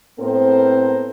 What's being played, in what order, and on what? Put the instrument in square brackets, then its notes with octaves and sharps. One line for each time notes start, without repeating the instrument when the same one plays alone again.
[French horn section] A2 B3 C4 A4 A#4 C5